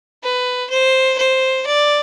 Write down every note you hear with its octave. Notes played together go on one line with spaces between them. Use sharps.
B4
C5
C5
D5